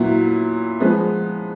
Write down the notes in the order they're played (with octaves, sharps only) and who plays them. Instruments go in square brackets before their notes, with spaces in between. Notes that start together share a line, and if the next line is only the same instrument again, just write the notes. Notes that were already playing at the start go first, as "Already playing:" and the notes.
Already playing: [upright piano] A#2 F#3 B3 E4
F3 G#3 B3